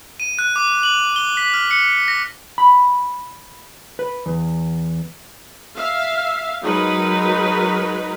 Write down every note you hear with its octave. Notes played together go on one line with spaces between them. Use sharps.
D#7
F#6
D6
F#7
G7
B6
F6
C#7
A#6
B5
B4
E2
E5 F5
F#3 G#3 D#4 A#4 B4